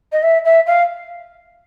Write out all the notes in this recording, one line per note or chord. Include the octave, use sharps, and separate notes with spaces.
D#5
E5
E5
F5